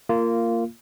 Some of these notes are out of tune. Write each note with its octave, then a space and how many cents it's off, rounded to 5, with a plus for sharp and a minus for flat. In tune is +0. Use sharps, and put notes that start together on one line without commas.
A#3 -15 F4 -15